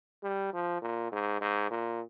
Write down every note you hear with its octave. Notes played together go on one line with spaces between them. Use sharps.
G3
F3
A#2
G#2
G#2
A#2